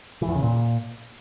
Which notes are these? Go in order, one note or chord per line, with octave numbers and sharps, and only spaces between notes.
E3
E2
C#3
A#2